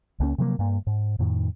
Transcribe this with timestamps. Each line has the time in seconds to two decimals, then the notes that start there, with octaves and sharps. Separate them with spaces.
0.20 C#2 A#3 C#4
0.38 C3 F3 F#3 A#3
0.59 G2 A#3
0.87 G#2
1.19 F2 A2 D#3